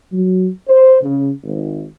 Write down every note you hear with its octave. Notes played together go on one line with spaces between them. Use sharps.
F#3
C5
C#3
G#1